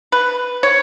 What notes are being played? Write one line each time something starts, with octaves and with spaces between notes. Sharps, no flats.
B4
C#5